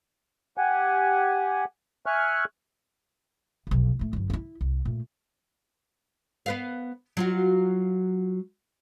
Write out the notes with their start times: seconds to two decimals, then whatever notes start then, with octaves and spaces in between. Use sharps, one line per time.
0.57 G4 F#5 G#5
2.06 E5 G#5 C#6 F6 F#6
3.67 F1 B1
3.99 A2 A3
4.13 G1 F#2
4.30 D#4 E4
4.61 C2
4.85 A#2 A3
6.46 B3 B4 F5
7.17 F#3 F4 F#4